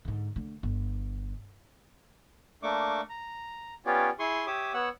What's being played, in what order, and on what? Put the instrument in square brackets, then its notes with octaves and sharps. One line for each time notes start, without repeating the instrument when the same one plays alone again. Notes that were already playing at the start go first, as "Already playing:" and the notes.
[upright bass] G#2 D3
D3 A3
G1
[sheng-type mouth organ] A3 A#3 D4 C#6 D6
A#5
B3 C#4 F4 G4 C#5 D5
E4 G#4 C6 C#6 D#6
G4 C#5 E5 D6 D#6
B3 C#5 F#5 E6